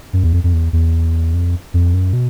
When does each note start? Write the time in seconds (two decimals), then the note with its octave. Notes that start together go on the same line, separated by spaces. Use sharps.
0.13 F#2
0.24 E2
0.33 F2
0.44 F2
0.53 E2
0.73 E2
1.34 F2
1.74 F2
1.94 F#2
2.13 B2